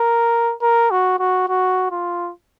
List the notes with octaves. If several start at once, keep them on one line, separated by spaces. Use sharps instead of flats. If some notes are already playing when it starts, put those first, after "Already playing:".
Already playing: A#4
A#4
F#4
F#4
F#4
F4